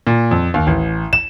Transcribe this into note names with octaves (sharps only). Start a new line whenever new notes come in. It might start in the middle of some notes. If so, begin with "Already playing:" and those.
A#2
F2
D#2
A1
E7